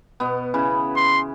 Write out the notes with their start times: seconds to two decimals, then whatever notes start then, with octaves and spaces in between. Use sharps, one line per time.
0.20 B2 B3
0.54 C#3 E3 B5
0.96 C6